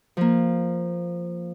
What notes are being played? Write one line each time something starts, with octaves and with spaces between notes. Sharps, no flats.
F3 A#3